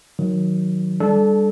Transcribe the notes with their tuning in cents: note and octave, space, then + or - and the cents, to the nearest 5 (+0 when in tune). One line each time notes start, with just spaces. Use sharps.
D#3 +0 F#3 -10
G3 +25 D4 +0 A4 -25